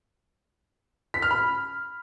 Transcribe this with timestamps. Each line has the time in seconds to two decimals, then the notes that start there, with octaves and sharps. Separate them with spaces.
1.14 B6
1.22 F6
1.31 B5